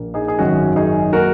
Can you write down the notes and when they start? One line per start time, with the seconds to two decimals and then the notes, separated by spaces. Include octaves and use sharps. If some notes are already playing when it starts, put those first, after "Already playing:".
Already playing: A#1 A#2 A#3
0.14 D#4 G#4
0.28 G#4
0.39 G#1 F#2 D#3 C#4 F#4
0.76 D#4 G#4
1.13 F#3 A#3 F#4 A#4